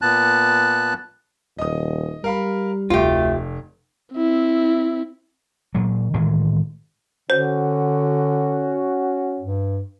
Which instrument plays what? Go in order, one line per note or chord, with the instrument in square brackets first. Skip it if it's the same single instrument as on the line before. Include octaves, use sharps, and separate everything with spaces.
[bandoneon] A#2 B3 A5 F#6
[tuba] D#1 [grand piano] D#5 D#6
[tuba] G3 [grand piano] A#4 F5 B5
[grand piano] F1 [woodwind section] D2 A3 [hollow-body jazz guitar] F4 G4
[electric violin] C4 E4
[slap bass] A#2 F#3
A2 D#3 E3 G#3
[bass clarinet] D3 [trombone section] C#4 F#4 [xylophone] C5
[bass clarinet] G2